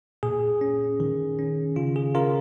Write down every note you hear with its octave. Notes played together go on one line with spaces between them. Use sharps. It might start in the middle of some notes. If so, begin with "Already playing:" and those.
A#2 G#4
C#4
D#3
C#4
C#3 F4
G#4
C#4 F4 A#4